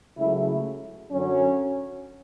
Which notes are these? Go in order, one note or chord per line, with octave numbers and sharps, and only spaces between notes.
C#2 C#3 F#3 A3 E4
F#2 D3 F#3 C#4